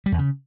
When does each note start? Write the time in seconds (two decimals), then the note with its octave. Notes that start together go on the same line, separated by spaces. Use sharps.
0.06 G3
0.12 E2
0.18 C#3